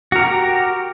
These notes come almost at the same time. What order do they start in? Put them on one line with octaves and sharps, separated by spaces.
F#4 A#4 G4 A#5